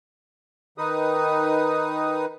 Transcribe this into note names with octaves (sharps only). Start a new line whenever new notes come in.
D#3 D#4 B4 D#6